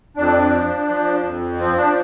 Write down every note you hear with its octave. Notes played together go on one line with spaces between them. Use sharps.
F2 D4
F3
F3
F2
F3 C4
D4